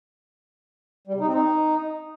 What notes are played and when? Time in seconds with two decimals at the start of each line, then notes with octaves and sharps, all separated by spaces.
1.07 G3
1.14 C3
1.20 D#4
1.27 C4
1.34 D#4